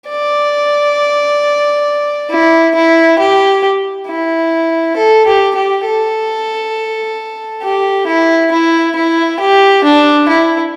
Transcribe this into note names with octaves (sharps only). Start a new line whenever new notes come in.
D5
E4
E4
G4
E4
A4
G4
G4
A4
G4
E4
E4
E4
G4
D4
E4